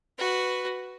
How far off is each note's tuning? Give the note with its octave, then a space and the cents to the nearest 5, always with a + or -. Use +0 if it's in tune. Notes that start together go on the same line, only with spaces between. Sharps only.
F#4 +0 B4 +0